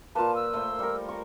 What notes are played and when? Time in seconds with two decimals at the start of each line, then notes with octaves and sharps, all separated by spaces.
0.15 A#2 A#3 F4 B4 A5
0.36 E6
0.53 A3 C5
0.79 G3 A#4 C#6
1.09 A#5 C#6